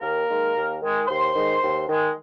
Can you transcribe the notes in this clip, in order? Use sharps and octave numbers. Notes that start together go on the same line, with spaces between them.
D#2 A#3 A#4
D#3 G#3
D#2
D#3 G#3
D#2 C5 C6
D#3 G#3
D#2
D#3 G#3